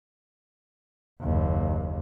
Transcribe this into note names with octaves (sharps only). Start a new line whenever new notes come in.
F#1 D#2